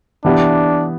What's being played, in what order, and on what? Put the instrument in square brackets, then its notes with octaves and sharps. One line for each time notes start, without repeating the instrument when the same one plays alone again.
[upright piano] E3 B3 G4 [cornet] D4